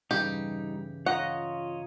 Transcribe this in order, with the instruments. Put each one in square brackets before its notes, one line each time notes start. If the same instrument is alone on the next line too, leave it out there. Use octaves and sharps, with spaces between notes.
[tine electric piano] G2 C#3 E3 [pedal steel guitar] G3 D#4 [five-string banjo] G4
[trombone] F4 [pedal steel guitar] C#5 D#5 A#5 [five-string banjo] F#5